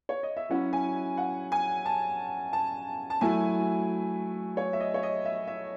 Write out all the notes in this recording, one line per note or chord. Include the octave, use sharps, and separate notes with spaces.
C#5
D#5
E5
F#3 C#4 E4 F#5
G#5
F#5
G#5
A5
A5
A5
F#3 A3 E4 G#5
C#5
E5
D#5
C#5
D#5
E5
E5